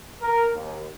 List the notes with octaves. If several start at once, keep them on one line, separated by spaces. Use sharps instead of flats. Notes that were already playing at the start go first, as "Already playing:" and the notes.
A#4
D#2